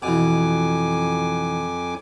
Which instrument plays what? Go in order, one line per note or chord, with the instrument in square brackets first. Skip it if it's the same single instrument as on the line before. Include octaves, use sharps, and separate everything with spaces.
[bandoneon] F2 G#5 D6 [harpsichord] B2 E3